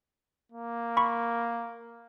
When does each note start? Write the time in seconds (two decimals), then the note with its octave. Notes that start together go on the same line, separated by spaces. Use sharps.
0.52 A#3
0.97 B5 C#6